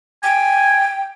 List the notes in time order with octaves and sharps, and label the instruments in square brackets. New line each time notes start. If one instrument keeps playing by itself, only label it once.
[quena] G5 [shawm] G#5